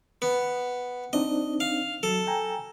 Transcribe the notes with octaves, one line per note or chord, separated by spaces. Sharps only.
B3
C4 D4 D#4 D#5
F5
F#3 A4
G5 G#5 A#5